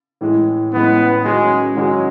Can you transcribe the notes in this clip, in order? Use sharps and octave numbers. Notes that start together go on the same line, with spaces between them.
A2 E3 G#3
A2 E3 G#3 B3
D#3 F#3 G#3 C#4 F#4
D#3 F#3 G#3 C#4 F#4